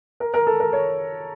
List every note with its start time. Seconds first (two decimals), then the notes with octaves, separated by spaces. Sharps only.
0.20 A#4
0.34 A#4
0.47 A4
0.60 A#4
0.73 C#5